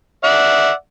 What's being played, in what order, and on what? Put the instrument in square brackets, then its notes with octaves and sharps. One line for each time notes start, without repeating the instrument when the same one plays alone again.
[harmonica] D5 E5 F#5